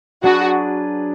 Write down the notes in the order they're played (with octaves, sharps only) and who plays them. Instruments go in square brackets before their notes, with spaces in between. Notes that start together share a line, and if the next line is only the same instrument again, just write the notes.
[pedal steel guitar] F#3 D4 G#4 B4 [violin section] F#4